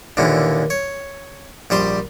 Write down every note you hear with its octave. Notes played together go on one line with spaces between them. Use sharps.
D#2 A#2 D3 E3
C#5
A#1 G3 C5 C6